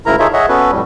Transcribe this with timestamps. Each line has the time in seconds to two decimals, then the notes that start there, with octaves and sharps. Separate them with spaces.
0.06 D2 G#2 C#3 E4 A#4 A#5
0.19 D#4 F4 G#4 A4 C#5 E5
0.33 G#4 C#5 D#5 E5 F#5
0.49 B3 C#4 F#4 A4 B4
0.71 F2 A2 G3